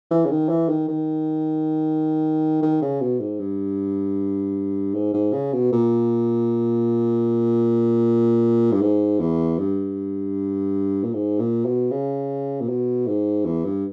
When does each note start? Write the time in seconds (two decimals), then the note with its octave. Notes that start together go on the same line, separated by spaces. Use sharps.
0.11 E3
0.26 C#3
0.30 D#3
0.49 E3
0.69 D#3
0.88 D#3
2.62 D#3
2.82 C#3
3.01 B2
3.20 G#2
3.40 G2
4.94 G#2
5.14 G#2
5.33 C#3
5.53 B2
5.72 A#2
8.72 G2
8.82 G#2
9.20 E2
9.59 G2
11.04 A#2
11.14 G#2
11.39 A#2
11.65 B2
11.91 C#3
12.61 A#2
12.68 B2
13.07 G#2
13.45 E2
13.65 G2